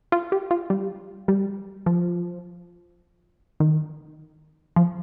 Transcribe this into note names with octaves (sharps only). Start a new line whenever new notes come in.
F4
G4
F4
G3
G3
F3
D#3
F3